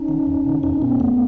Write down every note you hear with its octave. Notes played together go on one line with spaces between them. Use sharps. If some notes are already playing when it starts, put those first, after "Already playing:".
Already playing: C#4 D#4
D#3
E2
C3 D#3
E2 C#4 D#4
B2 B3 C#4
F2 A3 B3